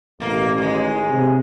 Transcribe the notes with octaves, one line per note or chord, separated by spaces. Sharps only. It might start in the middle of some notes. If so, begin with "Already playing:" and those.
A1 B2 A#3
D#2 G#3
C3